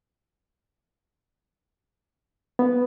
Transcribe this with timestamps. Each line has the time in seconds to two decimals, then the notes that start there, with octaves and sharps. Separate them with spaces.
2.59 B3